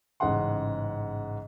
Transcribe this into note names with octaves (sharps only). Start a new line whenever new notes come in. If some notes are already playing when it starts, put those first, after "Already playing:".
A1 G#2 C#3 D#5 F#5 C6